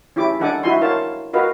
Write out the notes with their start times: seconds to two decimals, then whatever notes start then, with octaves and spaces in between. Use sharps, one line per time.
0.16 C#4 E4 G4 D6
0.40 D4 D#4 A4 F#5 G#5 D6
0.63 D#4 E4 F#4 G#5 C6
0.81 A#4 C5 C#5 F5 A5
1.33 F#4 A#4 B4 D#5 F5